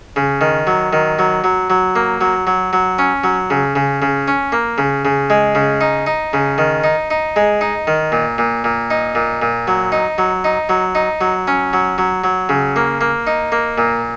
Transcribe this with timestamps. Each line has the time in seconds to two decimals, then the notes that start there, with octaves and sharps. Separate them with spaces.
0.16 C#3
0.41 D#3
0.67 F#3
0.93 D#3
1.19 F#3
1.44 F#3
1.70 F#3
1.96 A#3
2.21 F#3
2.47 F#3
2.73 F#3
2.99 C#4
3.24 F#3
3.50 C#3
3.75 C#3
4.02 C#3
4.28 C#4
4.52 A#3
4.78 C#3
5.05 C#3
5.30 G#3
5.55 C#3
5.81 D#4
6.06 D#4
6.33 C#3
6.58 D#3
6.84 D#4
7.10 D#4
7.36 G#3
7.61 D#4
7.87 D#3
8.12 A#2
8.38 A#2
8.64 A#2
8.90 D#4
9.15 A#2
9.42 A#2
9.67 F#3
9.92 D#4
10.18 F#3
10.44 D#4
10.69 F#3
10.95 D#4
11.21 F#3
11.47 C#4
11.73 F#3
11.98 F#3
12.24 F#3
12.49 C#3
12.76 A#3
13.01 A#3
13.27 D#4
13.52 A#3
13.78 A#2